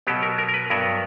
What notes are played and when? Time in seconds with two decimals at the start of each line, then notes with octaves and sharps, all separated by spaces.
0.07 B2 F#3 B3 G4
0.23 A#4
0.38 A#4
0.49 A#4
0.54 B4
0.70 G2 F#3 B3 A#4